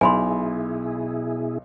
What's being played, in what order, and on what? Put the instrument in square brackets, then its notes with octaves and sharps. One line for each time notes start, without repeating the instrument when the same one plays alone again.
[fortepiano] B1 [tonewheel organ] B2 E4 G#4 [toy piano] G#5 B5 C6